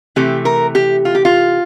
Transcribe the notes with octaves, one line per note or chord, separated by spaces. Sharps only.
C3 E3 A3 G4
A#4
G4
F4
G4
F4